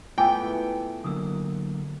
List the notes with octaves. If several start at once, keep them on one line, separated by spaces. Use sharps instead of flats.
A3 B3 E4 F4 G#4 G5 G#5
D3 F#3 A#3 D#6 E6